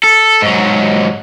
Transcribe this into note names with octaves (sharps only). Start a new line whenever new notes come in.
A4
G#2 F#3